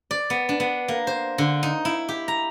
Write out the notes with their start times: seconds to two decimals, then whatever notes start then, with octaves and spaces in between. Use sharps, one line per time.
0.11 D5
0.30 B3
0.49 D4
0.60 B3
0.88 A#3
1.07 C5
1.38 D3
1.63 D#4
1.85 E4
2.09 G4
2.28 A#5